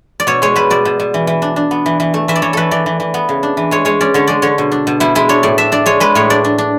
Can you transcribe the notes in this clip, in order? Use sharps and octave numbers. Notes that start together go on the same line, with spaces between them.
D5
B2 C#5
G#3 C#5
B2 B4
B2 D5
B2
B2
E3
E3
D4
D4
B3
E3
E3
A3
E3 E5
D5
E3 C#5
E3 A4 B4
E3 D5
E3
E3
B3
C#3
D4
E3
G#3 C#5
G#3 C#5
C#4 D5
D3 C#5
G#3 D5
D3 C#5
B2
D4
B2
B2 E4
G#3 E4
D4 C#5
A2 D5
D4 E5
D4 D5
G#3 C#5
G#3 B4
A2 C#5
D4 D5
D4
D4